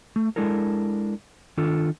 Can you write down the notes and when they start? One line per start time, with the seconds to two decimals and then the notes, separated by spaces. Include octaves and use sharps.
0.16 A3
0.36 G#3 D4 E4 A4 A#4
1.57 D#3 D4 F4 A4